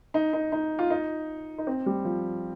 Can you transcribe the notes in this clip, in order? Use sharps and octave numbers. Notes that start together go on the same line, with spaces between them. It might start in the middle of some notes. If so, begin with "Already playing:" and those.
D#4
D#4
D#4
F4
D#4
D#4
C4
G3
F3